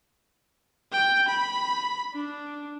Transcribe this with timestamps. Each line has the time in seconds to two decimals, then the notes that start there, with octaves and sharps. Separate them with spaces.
0.92 G5
1.28 B5
2.14 D4